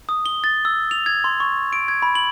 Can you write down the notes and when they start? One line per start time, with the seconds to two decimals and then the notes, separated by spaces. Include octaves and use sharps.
0.09 D#6
0.26 G7
0.44 A6
0.65 E6
0.91 F7
1.06 G#6
1.24 C6
1.40 C#6
1.73 D7
1.88 G#6
2.02 B5
2.15 F#7